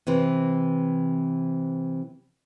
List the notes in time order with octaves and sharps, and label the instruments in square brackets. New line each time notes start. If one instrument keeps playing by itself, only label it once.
[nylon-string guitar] C3 E3 C4